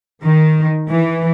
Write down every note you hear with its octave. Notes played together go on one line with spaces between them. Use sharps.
D#3
E3